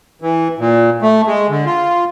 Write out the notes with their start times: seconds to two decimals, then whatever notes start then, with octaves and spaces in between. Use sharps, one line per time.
0.22 E3
0.59 A#2
1.02 A3
1.27 G#3
1.49 D3
1.66 F4